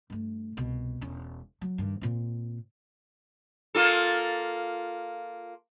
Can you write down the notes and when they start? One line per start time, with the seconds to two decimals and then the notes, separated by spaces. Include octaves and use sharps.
0.10 G2 A3
0.57 C2 B2
1.01 E1 C#4
1.61 F#3
1.78 G2 D#3
2.01 A#2 C4
3.75 A#3 F4 A4